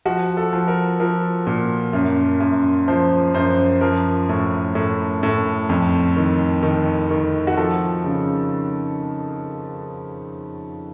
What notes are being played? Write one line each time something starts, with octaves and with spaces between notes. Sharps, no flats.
F3 F#4
A4
F3
A#4
F3 A#4
A#2
F#2
F#2
F3 C5
F#2 C5
F3 A#4
A2
A2
A2
F2
D#3
D#3
D#3
F#4
F3 A4
C#3